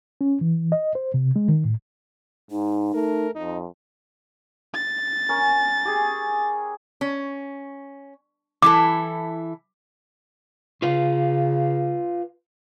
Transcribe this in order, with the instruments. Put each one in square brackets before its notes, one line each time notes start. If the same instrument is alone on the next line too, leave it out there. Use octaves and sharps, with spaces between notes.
[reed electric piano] C#4
E3
D#5
C5
C3
G#3
D#3
A2
[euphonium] G#2 [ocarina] D#4
[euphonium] A3 [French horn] A#4
[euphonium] F2 [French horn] D#4
[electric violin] A6
[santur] C#4 A#4
G4 G#4
[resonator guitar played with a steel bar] C#4
[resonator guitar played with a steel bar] E3 E4 A4 [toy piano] D6
[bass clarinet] C#3 [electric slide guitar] F4 B4 F5